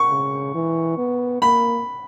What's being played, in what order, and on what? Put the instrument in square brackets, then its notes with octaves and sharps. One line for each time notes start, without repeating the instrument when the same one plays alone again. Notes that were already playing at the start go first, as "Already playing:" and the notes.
Already playing: [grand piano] C#6
[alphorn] C#3
E3
B3
[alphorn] A#3 [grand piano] B5